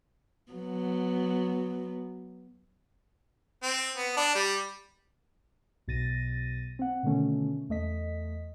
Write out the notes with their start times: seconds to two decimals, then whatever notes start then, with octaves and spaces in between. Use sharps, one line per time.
0.52 F#3 B3
3.63 C4
3.96 B3
4.17 D4
4.35 G3
5.88 B1 B2 A6 A#6 D#7
6.79 C4 F#5
7.03 B2 D3 D#3 A3 C#4
7.69 E2 A3 D#5 B6